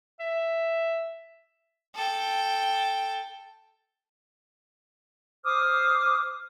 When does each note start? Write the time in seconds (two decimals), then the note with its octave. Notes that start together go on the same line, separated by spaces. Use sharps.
0.20 E5
1.95 A4 G5
5.44 C5 D6 D#6 F6